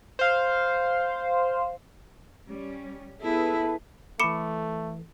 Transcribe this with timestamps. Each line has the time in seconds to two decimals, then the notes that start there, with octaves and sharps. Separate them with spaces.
0.19 C5 F5
2.47 G3 C#4
3.22 B3 E4 G#4 A4 B4
4.20 E3 A3 A4 B5 D6 C#7